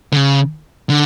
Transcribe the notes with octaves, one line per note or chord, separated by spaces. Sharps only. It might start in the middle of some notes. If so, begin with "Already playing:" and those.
D3
C#3
D3